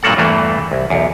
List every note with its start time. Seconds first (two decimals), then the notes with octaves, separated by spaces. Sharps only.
0.03 G2 A#2 F#3 A#3 A4 F#5
0.17 E2 G2 E3 A3 A#3
0.72 C2
0.90 B1 E2